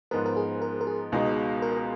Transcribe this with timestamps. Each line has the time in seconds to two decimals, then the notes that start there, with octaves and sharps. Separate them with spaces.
0.11 G#2 F3 G#3 B3 A#4
0.26 A#4
0.37 G#4
0.62 A#4
0.81 A#4
0.87 G#4
1.12 C#2 B2 G#3 D#4
1.62 A#4